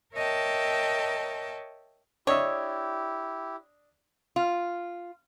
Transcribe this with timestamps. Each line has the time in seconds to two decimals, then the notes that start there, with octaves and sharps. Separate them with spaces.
0.13 A#4 C#5 D#5 E5 G5 A5
2.27 D4 E4 G4 C#5 D#5 E5
4.36 F4